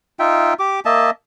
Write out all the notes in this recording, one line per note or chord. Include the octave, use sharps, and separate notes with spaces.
D#4 F4 E5 G5
G4 D6
A#3 D#5 E5 A5